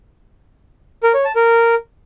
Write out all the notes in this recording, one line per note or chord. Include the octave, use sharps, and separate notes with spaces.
A#4
C#5
A5
A#4